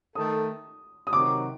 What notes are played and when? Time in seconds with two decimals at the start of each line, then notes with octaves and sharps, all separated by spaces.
0.15 D#3 A3 D#4 A4 D#6
1.07 D#6
1.13 C3 D#3 F#3 D6